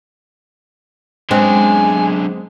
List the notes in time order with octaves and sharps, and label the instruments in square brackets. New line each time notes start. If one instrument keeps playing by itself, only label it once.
[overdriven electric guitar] F#2 D3 [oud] G#3 B3 C4 [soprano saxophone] G#5